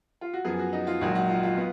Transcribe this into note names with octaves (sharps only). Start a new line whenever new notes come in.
F4
F#4
F#2 F3 B3 G#4
F#4
D#4
F4
A#1 G#2 D#3 F#3 F#4
F#4
F4
F4
B3